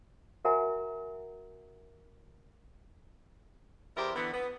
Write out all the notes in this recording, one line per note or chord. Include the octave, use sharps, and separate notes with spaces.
F#4 A#4 E5 F#5 G#5 A#5
E2 E4 G4 A#4 C5
D3 E3 B3
B3